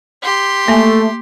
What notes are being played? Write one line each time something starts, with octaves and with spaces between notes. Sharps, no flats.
G4 C6
A3 A#3 G#5